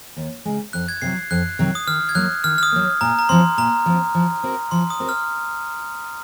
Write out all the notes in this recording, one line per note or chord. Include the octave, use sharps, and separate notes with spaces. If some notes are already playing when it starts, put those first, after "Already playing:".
D#2
C#3 G#3
F2 F#6
G#6
C3 D#3 F#3 C7
F2 F#6
C3 D#3 F#3
D#6
D#3 F6
G#6
F#3 A#3 F#6
D#3 F6
F6
D#6
F#3 A#3
A#2 A#5
A#5
F3 C4 C6
A#2 A#5
F3 C4
F3
C4 F#4 A#4
F3 C6
D#6
C4 F#4 A#4
F6